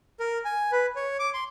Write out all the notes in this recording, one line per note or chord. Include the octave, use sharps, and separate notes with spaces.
A#4
G#5
B4
C#5
D6
C6